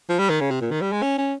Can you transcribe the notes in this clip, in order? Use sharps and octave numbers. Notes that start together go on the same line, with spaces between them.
F3
G3
D#3
C#3
C3
A#2
D#3
G3
G#3
C#4
C#4